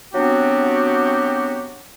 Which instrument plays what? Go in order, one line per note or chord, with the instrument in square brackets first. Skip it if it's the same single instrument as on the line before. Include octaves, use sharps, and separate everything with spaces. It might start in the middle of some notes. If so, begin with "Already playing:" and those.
[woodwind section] F#3 B3 C4 D4 F#4 G4